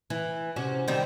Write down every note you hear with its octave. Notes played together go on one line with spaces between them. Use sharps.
E3
C3 C#4 F#4
D#3 G3 C4